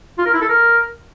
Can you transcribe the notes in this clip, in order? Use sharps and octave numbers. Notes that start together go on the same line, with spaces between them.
F4
A#4
E4
A4
A#4